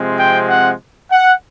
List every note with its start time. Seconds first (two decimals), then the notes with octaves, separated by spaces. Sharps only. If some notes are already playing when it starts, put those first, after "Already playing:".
Already playing: C3 F3 G#3 C4
0.17 G5
0.48 F#5
1.11 F#5